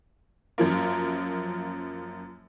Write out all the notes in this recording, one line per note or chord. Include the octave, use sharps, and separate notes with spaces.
F#2 F3 A#3